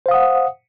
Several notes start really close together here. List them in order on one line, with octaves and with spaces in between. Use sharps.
C5 F5 D#6 F#5